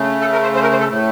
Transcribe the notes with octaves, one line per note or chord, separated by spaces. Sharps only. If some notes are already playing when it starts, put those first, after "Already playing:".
Already playing: C#3 A3
A4
A#4
C5
C5
A#4
C5
A4
A2 A3